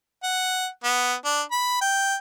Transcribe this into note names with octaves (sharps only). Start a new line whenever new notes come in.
F#5
B3
D4
B5
G5